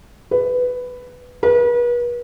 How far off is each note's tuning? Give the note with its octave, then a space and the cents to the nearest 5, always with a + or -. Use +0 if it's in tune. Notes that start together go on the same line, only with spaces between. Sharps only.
B4 +10
B4 -40